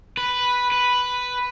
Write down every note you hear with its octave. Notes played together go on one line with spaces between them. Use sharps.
B4
B4